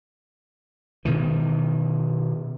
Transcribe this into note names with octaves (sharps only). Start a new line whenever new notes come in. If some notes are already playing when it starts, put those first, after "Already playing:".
B2 D#3 E3